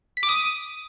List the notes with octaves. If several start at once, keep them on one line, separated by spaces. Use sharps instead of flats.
B6
D6
D#6